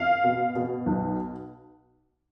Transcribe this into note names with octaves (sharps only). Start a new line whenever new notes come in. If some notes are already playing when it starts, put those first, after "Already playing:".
Already playing: F5
B2
B2
B1